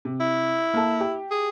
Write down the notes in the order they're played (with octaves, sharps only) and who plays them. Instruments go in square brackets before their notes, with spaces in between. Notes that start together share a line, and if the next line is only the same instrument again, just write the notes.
[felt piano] C3
[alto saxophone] E4
[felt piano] A#3 A4
G4
[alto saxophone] G#4